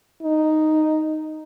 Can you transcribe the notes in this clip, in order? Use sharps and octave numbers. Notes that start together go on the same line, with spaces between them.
D#4